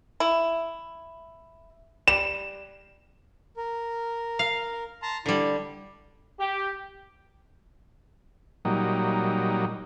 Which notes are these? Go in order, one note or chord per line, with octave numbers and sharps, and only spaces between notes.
E4
G3 E7
A#4
F5
A5 A#5 C6
D3 G3 E4
G4
A#2 F#3 G3 D#4